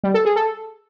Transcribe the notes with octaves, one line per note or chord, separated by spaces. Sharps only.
G3
A4
G#4
A4